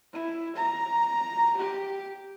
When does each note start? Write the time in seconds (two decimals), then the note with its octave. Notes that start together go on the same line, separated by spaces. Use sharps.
0.13 E4
0.56 A#5
1.58 G4